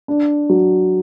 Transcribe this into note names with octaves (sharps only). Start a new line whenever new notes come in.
D4
F#3